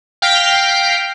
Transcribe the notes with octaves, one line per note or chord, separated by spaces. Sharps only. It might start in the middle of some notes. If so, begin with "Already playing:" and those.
F5 G5 F6 G6 A#6 B6